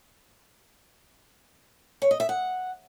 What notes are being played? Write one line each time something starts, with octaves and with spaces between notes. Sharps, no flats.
C#5
D#5
E5
F#5